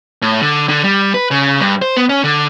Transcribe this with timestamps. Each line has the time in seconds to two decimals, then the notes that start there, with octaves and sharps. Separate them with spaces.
0.22 A2
0.42 D3
0.69 D3
0.84 G3
1.14 B4
1.31 C#3
1.60 G2
1.82 C5
1.97 B3
2.09 C#4
2.24 D3